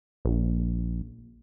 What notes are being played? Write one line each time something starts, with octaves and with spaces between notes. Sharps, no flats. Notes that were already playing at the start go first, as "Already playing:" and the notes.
A#1